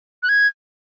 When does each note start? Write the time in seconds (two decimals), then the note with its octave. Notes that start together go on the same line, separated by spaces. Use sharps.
0.23 F#6
0.29 G#6